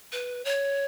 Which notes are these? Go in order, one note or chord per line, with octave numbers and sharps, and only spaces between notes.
B4
C#5